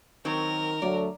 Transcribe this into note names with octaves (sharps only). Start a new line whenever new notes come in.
D#3 F#3 C4 A#4
D2 F#3 A3 D5